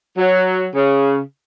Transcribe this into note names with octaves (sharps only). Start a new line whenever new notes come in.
F#3
C#3